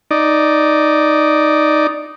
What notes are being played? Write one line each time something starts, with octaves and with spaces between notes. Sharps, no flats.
D#4 D5